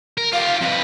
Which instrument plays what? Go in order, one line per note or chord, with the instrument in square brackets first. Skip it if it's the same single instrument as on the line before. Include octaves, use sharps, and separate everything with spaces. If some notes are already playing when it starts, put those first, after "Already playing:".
[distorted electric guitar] A#4
[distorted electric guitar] F4 G4 [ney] F5
[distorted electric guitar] F2 B4 [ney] F5